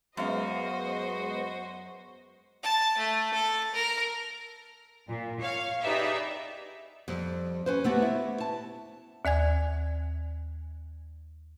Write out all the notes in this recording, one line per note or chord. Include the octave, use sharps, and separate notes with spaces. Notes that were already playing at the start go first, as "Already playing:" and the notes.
F#2 G#3 B3 F#4 C5 D#5 F5
A5
A3
A4
A#4
A#2
C#5 F5
D#4 G4 G#4 B4 D5 E5
F2 G3
C#4 B4 C5
A3 B3 F#4 G4
E4
A5
D#2 D5 G#5 G#6